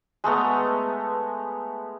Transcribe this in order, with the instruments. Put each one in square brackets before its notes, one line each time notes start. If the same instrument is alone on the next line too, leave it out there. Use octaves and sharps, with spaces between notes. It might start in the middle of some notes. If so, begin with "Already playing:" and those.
[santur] G#3 A3 B3 A#5